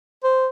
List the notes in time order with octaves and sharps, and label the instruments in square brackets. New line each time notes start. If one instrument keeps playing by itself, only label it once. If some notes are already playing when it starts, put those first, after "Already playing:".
[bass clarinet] C5